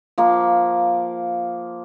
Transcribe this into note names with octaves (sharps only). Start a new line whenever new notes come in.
F3 A#3